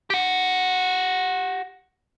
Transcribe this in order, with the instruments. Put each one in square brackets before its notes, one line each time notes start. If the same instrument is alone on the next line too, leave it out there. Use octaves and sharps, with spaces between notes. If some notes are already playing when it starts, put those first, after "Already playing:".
[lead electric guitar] G4 F#5